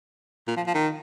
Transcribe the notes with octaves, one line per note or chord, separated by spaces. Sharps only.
A#2
F3
F3
D#3